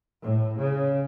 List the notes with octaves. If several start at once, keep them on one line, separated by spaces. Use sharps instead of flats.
A2
C#3